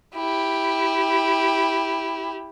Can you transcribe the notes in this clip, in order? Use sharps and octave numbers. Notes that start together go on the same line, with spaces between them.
E4 G4